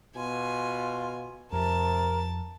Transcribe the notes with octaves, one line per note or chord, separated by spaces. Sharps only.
B2 F4 G#5
F2 C3 A#4 A5 A6